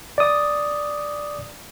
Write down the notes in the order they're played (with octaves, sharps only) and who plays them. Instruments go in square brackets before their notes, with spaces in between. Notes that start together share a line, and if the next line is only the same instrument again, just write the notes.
[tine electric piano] D5 D#6